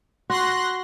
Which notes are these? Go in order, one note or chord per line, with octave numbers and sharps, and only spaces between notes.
F#4 C6 F#6 A#6